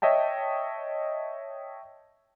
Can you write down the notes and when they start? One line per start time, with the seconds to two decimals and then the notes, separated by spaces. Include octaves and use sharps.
0.02 C#5 D#5 E5 G5 A5